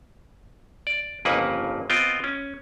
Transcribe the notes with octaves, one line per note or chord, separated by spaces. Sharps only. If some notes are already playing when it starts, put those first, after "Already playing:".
D5
G1 F2 C#3 A#3 B4 F#5
B3 C4 F4 D#5 G5
C#4